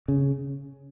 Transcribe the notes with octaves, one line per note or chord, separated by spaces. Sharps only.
C#3